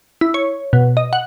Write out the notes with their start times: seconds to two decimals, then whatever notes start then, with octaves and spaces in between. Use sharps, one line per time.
0.21 E4
0.34 C#5
0.73 B2
0.97 D#5
1.13 F#5